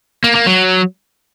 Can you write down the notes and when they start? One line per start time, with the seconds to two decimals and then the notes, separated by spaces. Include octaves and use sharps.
0.24 A#3
0.35 A#3
0.47 F#3